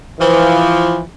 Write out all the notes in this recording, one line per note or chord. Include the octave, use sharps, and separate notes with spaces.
E3 F3